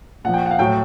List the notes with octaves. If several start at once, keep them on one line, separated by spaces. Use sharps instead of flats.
A#2 F3 F#5
G5
F#5
F5
A2 F#3 G5